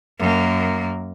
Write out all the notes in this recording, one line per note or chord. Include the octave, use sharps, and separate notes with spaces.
F#2 A#3